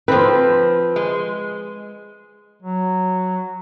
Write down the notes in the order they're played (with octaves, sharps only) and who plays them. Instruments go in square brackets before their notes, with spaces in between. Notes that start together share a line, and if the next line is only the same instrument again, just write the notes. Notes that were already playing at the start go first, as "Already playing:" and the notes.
[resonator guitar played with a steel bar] F3 C4 [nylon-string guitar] B4
[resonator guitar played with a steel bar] G#3
[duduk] F#3